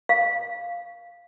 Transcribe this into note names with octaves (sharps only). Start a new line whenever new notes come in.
F5